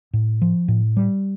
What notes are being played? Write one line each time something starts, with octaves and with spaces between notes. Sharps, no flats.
A2
F3
A2
G3